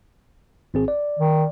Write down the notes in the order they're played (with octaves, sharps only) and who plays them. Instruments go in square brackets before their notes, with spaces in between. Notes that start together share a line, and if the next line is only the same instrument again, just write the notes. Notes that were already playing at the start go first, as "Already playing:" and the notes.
[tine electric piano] G#1 C4 G#4
D5
[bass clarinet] D#3